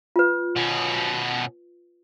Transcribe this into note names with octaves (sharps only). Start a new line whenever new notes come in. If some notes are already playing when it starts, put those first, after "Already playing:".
F4 B4
B2 C#4